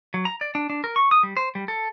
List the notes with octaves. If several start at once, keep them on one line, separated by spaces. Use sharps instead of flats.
F#3
A#5
D5
D4
D4
A#4
C#6
D#6
G3
C5
G3
A4